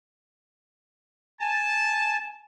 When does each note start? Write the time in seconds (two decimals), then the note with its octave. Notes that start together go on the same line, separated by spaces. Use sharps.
1.41 G#5 A5